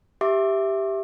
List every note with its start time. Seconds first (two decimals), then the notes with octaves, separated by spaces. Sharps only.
0.21 G4 E5 D6